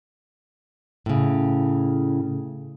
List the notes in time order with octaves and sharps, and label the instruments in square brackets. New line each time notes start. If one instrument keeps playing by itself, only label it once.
[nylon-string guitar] A2 C#3